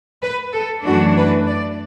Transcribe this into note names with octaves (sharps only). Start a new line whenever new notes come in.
B4
A4
F#2 E3 A3 D4 F#4
B4
D5